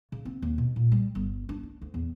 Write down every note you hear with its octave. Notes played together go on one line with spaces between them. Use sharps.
C#3
C4
D#2
B2
A#2
G3
G1
D4
D4
D2
E2